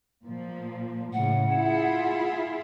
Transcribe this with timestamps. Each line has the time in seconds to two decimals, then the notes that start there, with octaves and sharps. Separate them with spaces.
0.24 A#2 F3
1.13 A2 C#3 F#5
1.50 E4 F4 G#4